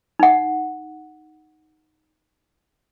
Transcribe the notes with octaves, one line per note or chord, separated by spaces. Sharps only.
D#4 F#5